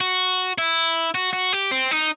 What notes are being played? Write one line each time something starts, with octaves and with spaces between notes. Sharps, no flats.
F#4
E4
F#4
F#4
G4
C4
D#4